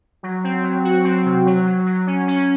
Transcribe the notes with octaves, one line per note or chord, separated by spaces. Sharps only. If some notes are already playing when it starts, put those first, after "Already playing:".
F#3
C4
F#3
F#4
C4
C3
F#3
F#3
F#3
C#4
C#4